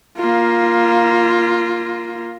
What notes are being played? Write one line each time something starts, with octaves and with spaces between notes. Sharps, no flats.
A#3 F4